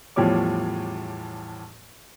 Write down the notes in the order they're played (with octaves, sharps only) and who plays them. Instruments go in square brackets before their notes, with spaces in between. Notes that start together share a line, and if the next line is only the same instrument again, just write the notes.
[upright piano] E2 A2 F3 G3 C#5 D6